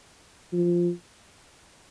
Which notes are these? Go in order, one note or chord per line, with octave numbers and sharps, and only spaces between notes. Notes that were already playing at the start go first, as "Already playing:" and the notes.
F3